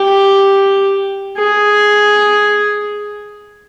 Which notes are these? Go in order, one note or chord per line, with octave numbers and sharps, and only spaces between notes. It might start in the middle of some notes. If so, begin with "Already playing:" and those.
Already playing: G4
G#4